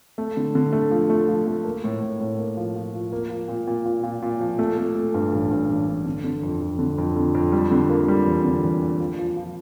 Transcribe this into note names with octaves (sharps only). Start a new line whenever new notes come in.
A3
D3
D3
A3
F3
A3
F3
A3
A#3
A2
A2
A2
A#3
F3
F3
F3
A#3
F3
A#2
A#2
A#2
A#2
A#2
F3
A3
A3
A3
G2
A1
G2
A1
G2
D3
D3
F2
F2
D3
F2
D3
F2
G3
D3
A#3
G3
E2
D3
E2
A#3
F3
F3
F3